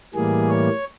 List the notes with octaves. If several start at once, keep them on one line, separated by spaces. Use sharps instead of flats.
A2 E3 G3 A#3 G#4
C#5